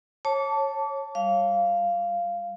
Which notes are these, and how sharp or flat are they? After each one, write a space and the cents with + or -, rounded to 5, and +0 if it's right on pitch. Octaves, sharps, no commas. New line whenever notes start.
C#5 -20 A5 +0 D6 -35
G3 +0 F5 -10